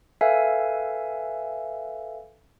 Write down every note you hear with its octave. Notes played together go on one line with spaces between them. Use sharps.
A4 B4 E5 F5 G#5